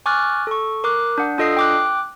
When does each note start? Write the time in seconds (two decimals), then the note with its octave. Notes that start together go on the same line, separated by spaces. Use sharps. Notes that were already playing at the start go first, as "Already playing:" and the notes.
0.06 G#5 C#6 D6 F6 F#6 A6
0.47 A4 C#6
0.84 A#4 D6 F#6
1.18 D4 F#5
1.38 D4 F4 A4 D#5 D#6 C7
1.57 G5 D6 F#6